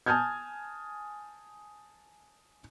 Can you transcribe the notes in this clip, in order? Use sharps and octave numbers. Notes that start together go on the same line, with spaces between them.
G#5 A5 D#6 F6 G6 G#6